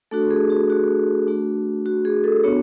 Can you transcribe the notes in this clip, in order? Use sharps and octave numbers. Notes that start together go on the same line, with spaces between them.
A3 D4 F#4 A4
G#4
F#4
F#4
A3 D4 F#4
F#4
G#4
A4
B3 D4 F#4 C#5